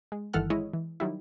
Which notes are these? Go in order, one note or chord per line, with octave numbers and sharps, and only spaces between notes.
G#3
G1 D#3 E3 A4 F#5 F6
G#3 E4 C#5 D#5
E3
D#3 F#3 G3 E4